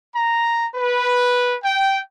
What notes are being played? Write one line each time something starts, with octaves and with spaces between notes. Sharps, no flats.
A#5
B4
G5